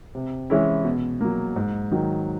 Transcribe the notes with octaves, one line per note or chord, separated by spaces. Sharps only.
C3
E3 G#3 C#4 E4
B2
F#3 A#3
G#2
D#3 F#3